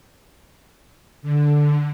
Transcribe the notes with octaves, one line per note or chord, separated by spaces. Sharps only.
D3